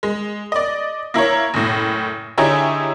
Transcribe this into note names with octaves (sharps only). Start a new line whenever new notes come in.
G#3
D5 D#5
A#3 E4 A#4 C#5
F#1 A2
D3 D#4 E4 G4 G#4 C#5